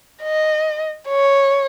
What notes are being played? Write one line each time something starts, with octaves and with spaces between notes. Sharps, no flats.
D#5
C#5